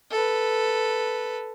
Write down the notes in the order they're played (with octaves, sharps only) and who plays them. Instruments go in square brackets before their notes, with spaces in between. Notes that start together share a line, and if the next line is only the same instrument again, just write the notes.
[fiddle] A4 B4